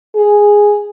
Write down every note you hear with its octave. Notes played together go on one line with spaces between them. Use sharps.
G#4